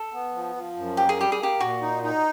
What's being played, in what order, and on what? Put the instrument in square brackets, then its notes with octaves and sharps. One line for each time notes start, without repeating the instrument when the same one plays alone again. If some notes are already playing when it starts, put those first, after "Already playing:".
Already playing: [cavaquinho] A4
[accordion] B3
F3
F3
F#2
[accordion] A#3 [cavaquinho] G4
[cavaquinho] G#4
[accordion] G3 [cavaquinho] G4
[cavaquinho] G#4
[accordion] A#3 [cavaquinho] G4
[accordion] A#2 [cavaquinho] F#4
[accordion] D#4
D#4